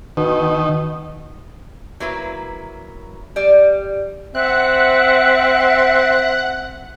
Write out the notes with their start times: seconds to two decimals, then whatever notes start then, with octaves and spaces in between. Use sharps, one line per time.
0.17 B2 D#3
2.00 F#3 A#3 E4 B4
3.36 G3 D5
4.35 C4 E5 F#5 F#6